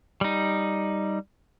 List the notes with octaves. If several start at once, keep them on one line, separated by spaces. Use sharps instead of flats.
G3 D#4